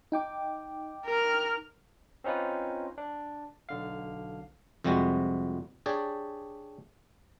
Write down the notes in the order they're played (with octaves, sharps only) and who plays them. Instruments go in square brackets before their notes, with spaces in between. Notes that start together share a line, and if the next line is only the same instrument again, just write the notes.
[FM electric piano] D#4 G5 D6
[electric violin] A#4 F6
[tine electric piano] C4 C#4 D#4 F4 B4
D4
B1 D3 F5
[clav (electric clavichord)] F2 C3 G3 G#3 F#4
D4 G4 G#4 C#5 D5